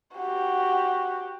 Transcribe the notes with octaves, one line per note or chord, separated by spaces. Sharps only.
F#4 G4